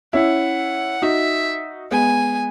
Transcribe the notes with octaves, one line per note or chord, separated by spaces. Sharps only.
C#4 E4 F#5
D#4 F#4 E5
G#3 B3 G#5